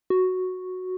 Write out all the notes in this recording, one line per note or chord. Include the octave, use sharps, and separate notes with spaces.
F#4